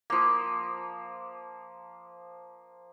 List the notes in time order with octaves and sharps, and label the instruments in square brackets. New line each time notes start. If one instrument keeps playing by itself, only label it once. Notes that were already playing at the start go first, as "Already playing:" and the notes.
[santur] F3 A#3